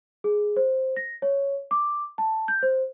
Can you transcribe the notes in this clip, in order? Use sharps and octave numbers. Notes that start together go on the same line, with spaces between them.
G#4
C5
A#6
C#5
D6
A5
G6
C5